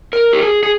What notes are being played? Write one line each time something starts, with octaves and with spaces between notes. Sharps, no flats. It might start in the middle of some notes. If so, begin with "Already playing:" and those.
A#4
G4
G#4
G#4